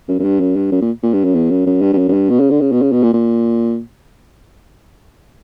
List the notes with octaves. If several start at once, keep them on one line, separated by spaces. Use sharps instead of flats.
F#2
F#2
G2
F#2
G2
F#2
A#2
A#2
G2
F#2
E2
F#2
F#2
G2
G2
F#2
F#2
G2
B2
C#3
D3
C#3
B2
C#3
B2
A#2
A#2